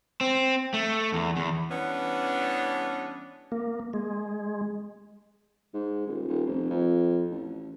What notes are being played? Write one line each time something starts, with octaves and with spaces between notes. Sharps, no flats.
C4
A3
E2
E2
E3 G3 B3 C#4 D4
A#3
G#3
G#2
D#1
D#1
F1
F2
A1